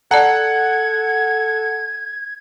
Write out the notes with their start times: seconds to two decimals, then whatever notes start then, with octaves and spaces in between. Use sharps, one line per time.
0.11 A4 D5 F#5 A5 A#5 G#6